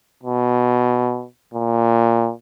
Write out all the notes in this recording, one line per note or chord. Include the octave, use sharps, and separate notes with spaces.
B2
A#2